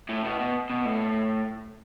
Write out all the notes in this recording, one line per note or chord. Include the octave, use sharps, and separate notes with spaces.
A2
B2
B2
B2
A2